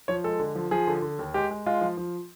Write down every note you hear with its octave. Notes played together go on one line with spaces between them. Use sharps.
F3 C#5
G#3 A4
D3
F3
F3 G#4
D3
D3
D#2
G#3 G4
G#3
G#3 F4
F3
F3